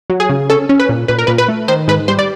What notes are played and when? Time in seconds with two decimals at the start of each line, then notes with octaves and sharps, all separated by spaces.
0.10 F#3
0.20 G#4
0.29 C#3
0.50 C#4 A4
0.69 C#4
0.80 B4
0.89 A#2
1.08 A#2 B4
1.19 A#4
1.27 A#2 B4
1.38 B4
1.48 A3
1.68 D#3 C5
1.88 G#2 B4
2.08 G3 C5
2.19 D5